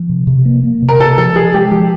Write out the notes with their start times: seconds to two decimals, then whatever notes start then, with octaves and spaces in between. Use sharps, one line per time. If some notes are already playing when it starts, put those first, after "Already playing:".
Already playing: F3
0.09 C3
0.27 C3
0.45 A#3
0.63 A#3
0.82 C3
0.89 A#4
1.00 C3 A4
1.18 F3 A4
1.36 F3 G#4
1.54 G#3 G4
1.71 F3 G4